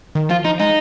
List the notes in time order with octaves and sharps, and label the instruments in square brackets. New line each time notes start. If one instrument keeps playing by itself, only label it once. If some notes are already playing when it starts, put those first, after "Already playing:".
[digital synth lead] D#3
[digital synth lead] F3 [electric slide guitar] F4
[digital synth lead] F3 [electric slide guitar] D#4
[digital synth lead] G#3 [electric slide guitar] D#4